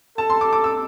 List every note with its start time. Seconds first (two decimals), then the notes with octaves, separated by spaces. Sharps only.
0.18 A4 A5
0.30 C6
0.41 D6
0.53 D6
0.64 E6